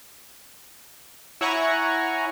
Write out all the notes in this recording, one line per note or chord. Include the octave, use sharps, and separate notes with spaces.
E4 C#5 F#5 G#5 A#5 C#6